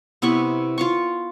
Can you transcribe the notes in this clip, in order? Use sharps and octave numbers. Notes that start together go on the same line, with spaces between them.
C3 B3 E4 C#6
F4 F5 C#6